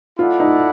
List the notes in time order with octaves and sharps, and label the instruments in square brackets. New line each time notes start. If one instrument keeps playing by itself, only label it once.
[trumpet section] E4 A4 D5 F#5 [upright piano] F4
[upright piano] D#4